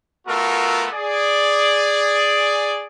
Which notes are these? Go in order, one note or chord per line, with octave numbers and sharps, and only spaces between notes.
A3 B3 F4 F#4 A4 A#4
G#4 D5